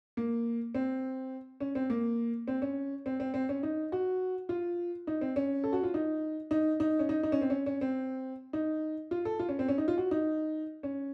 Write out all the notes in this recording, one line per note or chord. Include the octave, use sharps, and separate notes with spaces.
A#3
C4
C#4
C4
A#3
C4
C#4
C4
C4
C4
C#4
D#4
F#4
F4
D#4
C4
C#4
A4
F#4
F4
D#4
D#4
D#4
C#4
D#4
D#4
C#4
C4
C#4
C#4
C4
D#4
F4
A4
F4
C#4
C4
C#4
D#4
F4
F#4
D#4
C#4